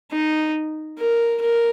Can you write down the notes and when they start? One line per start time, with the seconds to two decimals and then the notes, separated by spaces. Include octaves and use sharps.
0.12 D#4
0.99 A#4
1.41 A#4